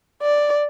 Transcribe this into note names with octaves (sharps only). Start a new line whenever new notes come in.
D5